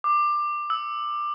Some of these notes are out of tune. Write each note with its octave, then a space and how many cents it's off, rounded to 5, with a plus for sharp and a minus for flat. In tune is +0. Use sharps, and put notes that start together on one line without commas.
D6 +20
E6 -20